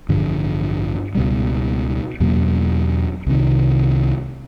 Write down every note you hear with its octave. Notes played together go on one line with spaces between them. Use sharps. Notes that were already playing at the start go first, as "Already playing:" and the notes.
A1 G2 D3 F3
C#2 B2 G3
E2 B2 F#3 A#3
C2 C3 D#3